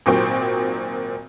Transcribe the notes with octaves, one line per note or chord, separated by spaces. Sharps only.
G#1 A#2 F#3 C4 G5 C#6